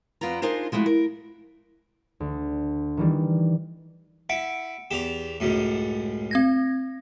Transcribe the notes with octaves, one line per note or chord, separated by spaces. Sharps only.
F2 B3 F4 D5 A#5
D4 D#4 F4 G#4 A#4 C5
F3 G#3 A3 E4 F#4
A#4
D2
D#3 E3 G3
E4 F#5 C#7 D7
E2 G4 E7 F7
C#2 F#2 A2
C4 G#6 A#6